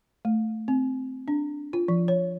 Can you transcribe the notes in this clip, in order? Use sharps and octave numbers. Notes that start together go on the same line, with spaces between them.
A3
C4
D4
F4
F3
C#5